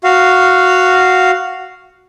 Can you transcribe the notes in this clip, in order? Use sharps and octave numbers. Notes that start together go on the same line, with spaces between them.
F#4 F5